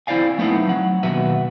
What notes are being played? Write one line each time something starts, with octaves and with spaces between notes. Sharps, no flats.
C4 E4 C5 D5 F5 G#5
F#3 A3 B3 C4 D#4 E4
F#3 F#5
D#2 B2 F#4 B4 E5 F#5